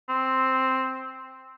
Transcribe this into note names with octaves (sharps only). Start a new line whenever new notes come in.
C4